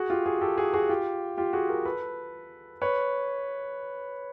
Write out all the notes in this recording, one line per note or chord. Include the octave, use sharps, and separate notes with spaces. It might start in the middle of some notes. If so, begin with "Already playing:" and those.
Already playing: F#4 G#4
F4 G4
F#4 G#4
G4 A4
F#4 G#4
F#4 G#4
F4 G4
F4 G4
F#4 G#4
G#4 A#4
A4 B4
B4 C#5